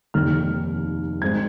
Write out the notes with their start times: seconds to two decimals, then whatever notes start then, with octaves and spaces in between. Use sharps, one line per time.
0.14 F1 D#2 D#3 F6
1.22 G#1 G#2 G#3 C4 G#6